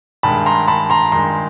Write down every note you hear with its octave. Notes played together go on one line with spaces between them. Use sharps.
G2 D#3 G#3 A5 B5
A#5 C6
A5 B5
A#5 C6
G2 D#3 G#3 A#5 C6